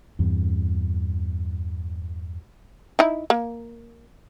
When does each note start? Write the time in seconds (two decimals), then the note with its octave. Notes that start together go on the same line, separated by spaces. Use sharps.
0.19 E2 G2 C4
2.99 D#4 E4
3.30 A#3